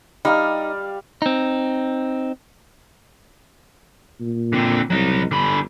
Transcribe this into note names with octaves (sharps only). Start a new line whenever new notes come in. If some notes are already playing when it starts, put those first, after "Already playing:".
G3 D#4 F5
C4 D#4
A#2
D3 C4
C2 F#3 D#5
G1 D3 B5